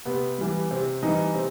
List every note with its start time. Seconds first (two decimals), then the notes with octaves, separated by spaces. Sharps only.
0.05 C3 B3
0.38 E3 G3
0.71 C3 C4
1.03 E3 G3 D#4
1.34 C3 C4